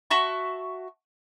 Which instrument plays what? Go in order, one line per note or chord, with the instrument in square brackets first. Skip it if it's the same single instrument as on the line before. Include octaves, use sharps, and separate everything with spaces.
[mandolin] F#4 E5 A5 C#6